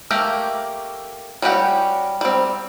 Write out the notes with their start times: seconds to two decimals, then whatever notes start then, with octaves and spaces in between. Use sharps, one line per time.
0.11 A3 A#3 G4 A#4
1.42 G3 C#4 F#4 G4 F#5
2.21 G3 C4